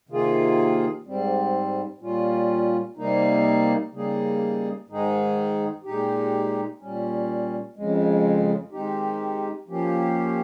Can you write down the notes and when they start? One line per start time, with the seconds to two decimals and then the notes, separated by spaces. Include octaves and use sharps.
0.09 C3 D#3 A#3 F4 G#4
1.05 G#2 G3 C4
2.01 A#2 G3 C#4 F4
2.97 C3 G3 A#3 D#4
3.92 C#3 G3 A#3 D#4 G#4
4.89 G#2 D#3 G#3 D#4 G#4
5.84 A#2 G#3 D#4 G4
6.80 A#2 G3 C#4
7.76 F2 C#3 G#3
8.72 D#3 G#3 C4 D#4 G4
9.68 F3 A#3 C#4 G4